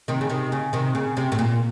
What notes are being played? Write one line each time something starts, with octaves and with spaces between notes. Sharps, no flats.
C3 D#3
C#3
C3 D#3
C#3
C3 D#3
C#3
C3
A2
A#2